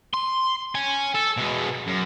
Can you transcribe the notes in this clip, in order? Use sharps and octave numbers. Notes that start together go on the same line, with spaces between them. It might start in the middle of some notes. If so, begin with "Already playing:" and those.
C6
C#5 G#5
A4
B2 G#3
F#2